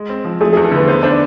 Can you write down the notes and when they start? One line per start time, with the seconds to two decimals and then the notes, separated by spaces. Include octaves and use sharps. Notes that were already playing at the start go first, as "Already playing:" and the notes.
Already playing: G#3
0.10 C4
0.25 F3
0.41 A3 G#4
0.53 G#4
0.57 E2
0.64 A4
0.72 D3 B4
0.87 B3 C5
1.03 D4 C5
1.11 D5